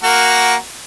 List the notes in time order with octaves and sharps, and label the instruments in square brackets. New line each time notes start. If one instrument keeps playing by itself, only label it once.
[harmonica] A#3 F#4 A#4